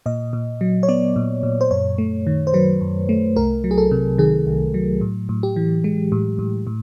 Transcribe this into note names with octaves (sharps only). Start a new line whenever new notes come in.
A#2 D#5
A#2
F#3
C#5
B3 D5
A#2
A#2
C5
F#2 C#5
A3
D#3
C5
F#3 B4
F#2
A3
C2 A#4
F#3
G#4
A4
C3
D#3 G#4
C2
F#3
A2
A2
G4
E3
G#3
A2
A2
A2